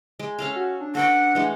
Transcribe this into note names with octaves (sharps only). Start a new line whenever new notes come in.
G#3
C#4 A4 F5
F#4
D4
A4 B4 F#5 G5
E3 G#3 A3